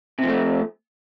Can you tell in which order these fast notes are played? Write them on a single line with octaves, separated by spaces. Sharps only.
C3 F3 A3